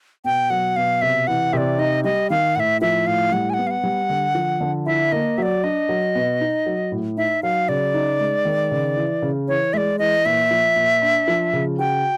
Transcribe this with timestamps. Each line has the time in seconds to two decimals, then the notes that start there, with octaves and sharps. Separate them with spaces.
0.24 B2 G5
0.50 F#3 F#5
0.76 B2 F5
1.02 C3 E5
1.27 E3 F#5
1.53 C3 D5 E5
1.78 D#4 D#5
2.04 G3 D#5
2.30 D#3 F5
2.56 A2 E5 F#5
2.81 F3 E5
3.07 A2 F5
3.32 G3 F#5
3.50 G#5
3.54 B3 F#5
3.67 F5
3.71 F#5
3.83 G3
4.10 D3
4.35 F3
4.61 D3
4.86 E4 E5
5.12 A#3 D#5
5.38 F#3 D5 E5
5.64 D4 D#5
5.89 F#3
6.15 B2
6.41 D#4
6.66 F#3
6.92 A2
7.17 D#4 E5
7.43 F#3 F5
7.69 C#3 D5
7.94 D#4
8.20 G#3
8.45 D#3
8.71 C#3
8.96 E3
9.22 C#3
9.48 E3 C#5
9.73 G#3 D5 E5
9.99 E3 D#5
10.25 A#2 E5
10.51 F3
10.76 A#2
11.02 D4
11.28 F3
11.53 C#3
11.79 F#4 G5